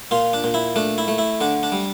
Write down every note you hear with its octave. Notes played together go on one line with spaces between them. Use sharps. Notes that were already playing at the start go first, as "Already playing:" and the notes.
A#2 F4
D4
A#2
E4
A3 D4
E4
A3
E4
D3 D4
D4
G3